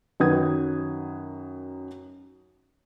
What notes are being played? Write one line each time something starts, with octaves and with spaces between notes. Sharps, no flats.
F#2 D#3 B4 F#5 D#6 G#6